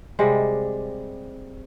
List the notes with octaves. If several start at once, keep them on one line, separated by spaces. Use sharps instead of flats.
C3 G3 G#3